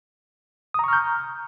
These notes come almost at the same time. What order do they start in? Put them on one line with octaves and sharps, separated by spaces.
D#6 A#5 C#6 F6 G6